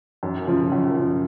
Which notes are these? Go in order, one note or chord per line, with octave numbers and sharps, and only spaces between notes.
F#2
C#3 F3
F#2
C#3 F3